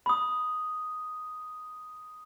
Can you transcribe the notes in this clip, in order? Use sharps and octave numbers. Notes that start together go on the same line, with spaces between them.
B5 D#6